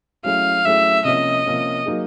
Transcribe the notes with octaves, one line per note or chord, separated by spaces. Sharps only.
F#3 A3 C#4 E4 G#4 F5
F#3 A3 C#4 E4 G#4 E5
C3 F3 A#3 C#4 D#5
C3 F3 A#3 C#4
F#3 A#3 D#4 G#4